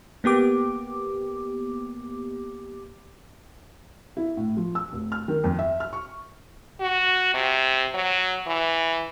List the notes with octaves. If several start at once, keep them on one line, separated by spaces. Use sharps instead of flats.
A#3 B3 G4 D6
E4
A2
F3
E6
F1
F6
D#3
F2
E5
F6
C#6
F#4
C3
F#3
E3